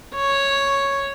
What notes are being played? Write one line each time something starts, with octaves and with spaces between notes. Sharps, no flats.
C#5